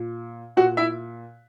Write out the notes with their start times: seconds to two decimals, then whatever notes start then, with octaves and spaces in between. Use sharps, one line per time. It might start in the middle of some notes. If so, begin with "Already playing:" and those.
Already playing: A#2
0.57 A#2 F#4 F#5
0.77 E4 E5